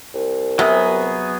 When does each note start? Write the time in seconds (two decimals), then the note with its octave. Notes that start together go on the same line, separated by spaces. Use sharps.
0.14 C2
0.59 C3 F#3 B3 G#4